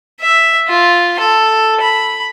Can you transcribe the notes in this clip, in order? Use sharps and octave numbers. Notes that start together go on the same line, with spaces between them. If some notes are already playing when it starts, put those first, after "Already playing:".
E5
F4
A4
B5